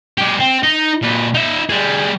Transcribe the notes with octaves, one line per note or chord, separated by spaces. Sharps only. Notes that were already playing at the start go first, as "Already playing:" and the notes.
G#3 G4
C4
D#4
A#2 B4
D#4 E5
G3 G#4